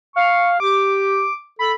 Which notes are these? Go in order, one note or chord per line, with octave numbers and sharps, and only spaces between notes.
F5 C#6
G4 D6
A4 B5